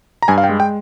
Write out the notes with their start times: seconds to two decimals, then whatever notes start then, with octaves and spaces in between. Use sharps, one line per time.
0.22 A#5
0.28 G2 G#5
0.38 F5
0.44 G5
0.49 G#3
0.60 G5